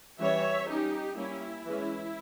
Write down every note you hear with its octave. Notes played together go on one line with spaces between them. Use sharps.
E3 G3 C#4 C#5 E5
G3 C#4 D#4 G4
G3 A#3 C#4 E4
E3 G#3 C#4